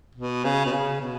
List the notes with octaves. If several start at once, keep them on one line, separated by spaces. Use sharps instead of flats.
B2
C#3
B2
C#3
B2